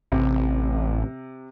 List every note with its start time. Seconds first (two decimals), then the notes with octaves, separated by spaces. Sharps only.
0.12 A1 C3